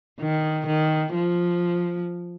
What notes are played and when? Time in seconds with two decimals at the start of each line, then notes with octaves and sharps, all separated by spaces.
0.20 D#3
0.67 D#3
1.14 F3